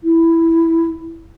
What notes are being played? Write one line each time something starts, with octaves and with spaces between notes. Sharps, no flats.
E4